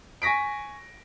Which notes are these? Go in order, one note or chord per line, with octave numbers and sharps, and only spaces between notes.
G#5 C#6 A#6 B6 D7